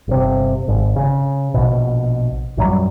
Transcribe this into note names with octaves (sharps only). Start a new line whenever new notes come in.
G1 C3
G#1
C#3
A#1 B2
A#1 F#2 F#3 G3